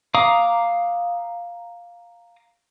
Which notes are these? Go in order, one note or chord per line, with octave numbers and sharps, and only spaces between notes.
F5 A#5 D6 D#6